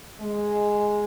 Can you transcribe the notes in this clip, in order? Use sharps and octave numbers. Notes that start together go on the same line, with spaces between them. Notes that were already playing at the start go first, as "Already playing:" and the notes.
G#3